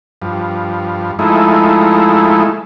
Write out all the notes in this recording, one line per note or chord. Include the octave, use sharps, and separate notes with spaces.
G2 F3
F3 G#3 A3 D#4 E4